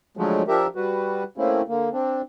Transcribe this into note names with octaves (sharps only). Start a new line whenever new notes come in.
D3 F3 F#3 G#3 A3
F3 D4 G4 A#4 E5
G3 F#4 B4
A3 A#3 C4 C#4 E4
D3 A#3
C4 D4